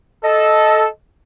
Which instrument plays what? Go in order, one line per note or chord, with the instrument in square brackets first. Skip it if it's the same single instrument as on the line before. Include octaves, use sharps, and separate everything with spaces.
[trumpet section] A4 [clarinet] D#5